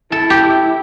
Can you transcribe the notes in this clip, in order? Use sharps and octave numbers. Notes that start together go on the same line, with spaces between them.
E4 A4
G4